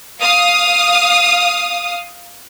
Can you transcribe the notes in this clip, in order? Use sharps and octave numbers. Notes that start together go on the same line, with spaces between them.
F5 D#6